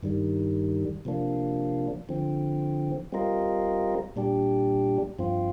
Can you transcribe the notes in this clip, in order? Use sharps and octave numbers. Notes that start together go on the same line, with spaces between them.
G2 D#3 G3
C3 F3 A#3 D4
D3 F3 C4
G3 C4 F4 A#4 D#5
A#2 G3 D4 G4
G2 F3 C4 F4